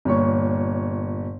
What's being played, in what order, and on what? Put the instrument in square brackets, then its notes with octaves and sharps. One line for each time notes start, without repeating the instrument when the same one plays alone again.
[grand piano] G1 A#2 C#5 C#6